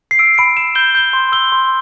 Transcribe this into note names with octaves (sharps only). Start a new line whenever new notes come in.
C7
E6 D7
B5 D7
B5 E7
G6 G7
G6 G7
C6
E6 G7
C6